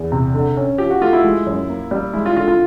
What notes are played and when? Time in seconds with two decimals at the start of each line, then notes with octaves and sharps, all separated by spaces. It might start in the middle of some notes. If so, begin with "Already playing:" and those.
Already playing: E2
0.12 C3
0.34 D3
0.57 C#4
0.78 F3 G4
0.90 F#4
1.02 A3 F4
1.13 E4
1.24 G#3
1.47 F#2
1.69 A#3
1.91 G3
2.13 G#3 E4
2.26 F4
2.37 D3 F4
2.48 F4